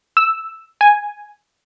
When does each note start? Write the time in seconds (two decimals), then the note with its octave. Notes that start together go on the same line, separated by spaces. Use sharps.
0.17 E6
0.81 G#5